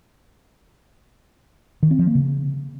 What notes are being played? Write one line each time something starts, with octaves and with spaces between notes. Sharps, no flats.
D#3
C4
F3
A#3
C#3